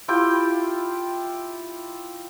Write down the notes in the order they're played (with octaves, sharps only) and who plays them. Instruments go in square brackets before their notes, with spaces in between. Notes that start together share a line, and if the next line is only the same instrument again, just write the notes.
[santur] E4 F4 G4 G5